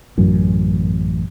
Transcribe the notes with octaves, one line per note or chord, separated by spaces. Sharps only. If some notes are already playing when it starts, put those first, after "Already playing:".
A1 F#2